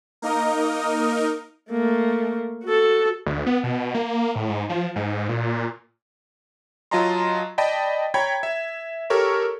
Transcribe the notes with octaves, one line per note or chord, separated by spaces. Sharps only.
A#3 D#4 A#4 D#5
A3 A#3
F#4 A4
D2
B3
B2
A#3
A2
G#2
F3
G#2
A#2
F#3 F4 D#5 A5 A#5 C6
D5 D#5 G5 A5 B5
C#5 G5 A#5 B5 G#6
E5
G4 A4 A#4 C#5 C#6